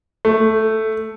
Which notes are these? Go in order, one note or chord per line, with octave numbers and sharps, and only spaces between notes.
A3